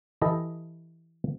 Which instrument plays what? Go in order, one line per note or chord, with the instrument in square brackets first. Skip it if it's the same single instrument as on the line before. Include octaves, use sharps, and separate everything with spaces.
[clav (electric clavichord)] E3 E4 G4 A4 D#5